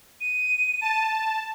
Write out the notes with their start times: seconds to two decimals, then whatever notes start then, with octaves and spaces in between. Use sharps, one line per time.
0.21 D#7
0.81 A5